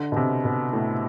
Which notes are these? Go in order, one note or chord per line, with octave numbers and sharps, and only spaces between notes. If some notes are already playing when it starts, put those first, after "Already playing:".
Already playing: D3
B2
C3
B2
A2